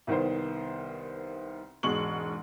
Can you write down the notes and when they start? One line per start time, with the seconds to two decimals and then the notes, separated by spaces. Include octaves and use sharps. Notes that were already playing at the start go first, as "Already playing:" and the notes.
0.07 C2 D#3 B3 C5
1.83 E1 G#2 G#3 C#6 F#7